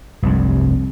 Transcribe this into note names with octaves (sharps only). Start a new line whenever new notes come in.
F1 C2 G2